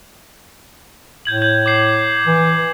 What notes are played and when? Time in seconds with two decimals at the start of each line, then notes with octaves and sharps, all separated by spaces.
1.25 A2 G6 G#6 F#7
1.42 G6
1.66 D6 G6 C7
2.26 E3